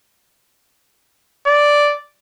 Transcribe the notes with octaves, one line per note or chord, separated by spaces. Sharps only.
D5